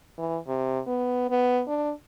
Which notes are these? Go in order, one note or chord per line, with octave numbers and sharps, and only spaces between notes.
E3
C3
B3
B3
D4